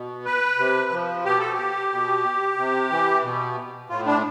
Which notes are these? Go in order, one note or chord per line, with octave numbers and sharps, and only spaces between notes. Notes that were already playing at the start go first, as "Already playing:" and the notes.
Already playing: B2
B4
C3
F3
B2 G4
A4
G4
B2
C3
E3
B2
A2 F4
D4